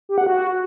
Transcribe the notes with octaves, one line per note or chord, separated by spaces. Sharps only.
G4
F#5
F#4